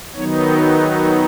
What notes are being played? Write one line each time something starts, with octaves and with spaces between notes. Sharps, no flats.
D#3 F#3 B3 D#4 C#5
A#4
G#4